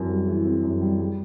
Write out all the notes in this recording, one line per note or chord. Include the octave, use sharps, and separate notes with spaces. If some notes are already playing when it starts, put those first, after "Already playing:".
Already playing: F#2 E3 C4
G3
E3
C4
F#2
G3
G3